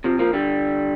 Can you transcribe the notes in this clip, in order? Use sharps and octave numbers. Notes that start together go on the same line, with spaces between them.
C3 F3
F3 A#3
D3 G3